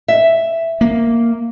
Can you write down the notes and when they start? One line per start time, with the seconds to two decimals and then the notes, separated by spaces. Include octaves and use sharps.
0.08 E5
0.81 A#3